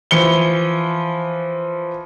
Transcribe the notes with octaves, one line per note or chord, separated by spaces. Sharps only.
E3 F3 C#7 G7